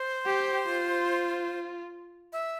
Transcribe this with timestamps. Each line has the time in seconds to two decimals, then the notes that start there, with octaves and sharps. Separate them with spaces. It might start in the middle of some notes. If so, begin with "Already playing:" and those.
Already playing: C5
0.26 G4
0.67 F4
2.33 E5